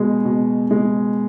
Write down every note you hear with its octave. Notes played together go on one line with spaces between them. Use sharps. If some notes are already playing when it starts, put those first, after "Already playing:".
Already playing: B2 G#3
B2
G#3